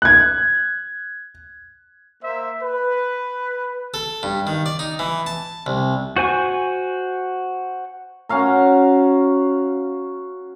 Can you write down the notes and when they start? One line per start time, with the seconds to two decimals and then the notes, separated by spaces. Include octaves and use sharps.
0.02 F#6 G#6
2.22 A#3 C5 E5
2.62 B4
3.94 A4
4.23 G2
4.47 D#3
4.66 D5
4.79 D#4
4.99 E3
5.26 A5
5.66 C2
6.16 F#4 C5 G#5 C#6
8.29 C#4 F#4 F5 A#5